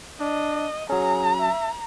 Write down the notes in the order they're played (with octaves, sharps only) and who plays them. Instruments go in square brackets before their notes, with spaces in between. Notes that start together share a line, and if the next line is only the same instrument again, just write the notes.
[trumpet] D4 [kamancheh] D#5
[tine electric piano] F#3 C#4 [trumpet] G#4 [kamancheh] A#5
[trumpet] E5